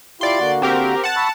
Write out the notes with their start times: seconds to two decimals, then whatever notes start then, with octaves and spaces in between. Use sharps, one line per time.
0.21 E4 F4 G4 D5 C6
0.39 D3 A#3 F#4
0.62 C4 G4 A#4
1.04 F#5 A5
1.16 B5 C#6 E6